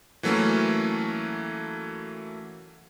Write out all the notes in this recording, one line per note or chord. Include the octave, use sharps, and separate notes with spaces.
E3 F#3 A3 A#3 C#4